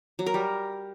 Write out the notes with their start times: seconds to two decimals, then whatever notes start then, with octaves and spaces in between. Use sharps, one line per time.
0.19 F#3
0.26 A#4
0.34 G3